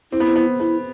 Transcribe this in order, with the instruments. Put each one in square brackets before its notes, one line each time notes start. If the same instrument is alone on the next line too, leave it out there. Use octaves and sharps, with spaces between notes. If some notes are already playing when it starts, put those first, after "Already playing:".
[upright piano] C4 [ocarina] E4
[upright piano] B3
C4
B3
[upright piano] B3 [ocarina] E4